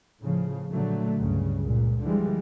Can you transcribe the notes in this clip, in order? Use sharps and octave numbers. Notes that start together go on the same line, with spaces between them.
A2 C#3 F3
A#2 D3 F#3 A3
C#2 G2 C#3
C#2 A#2
D3 E3 F3 G3 G#3